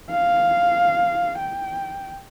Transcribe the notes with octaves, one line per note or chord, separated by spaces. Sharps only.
F5
G5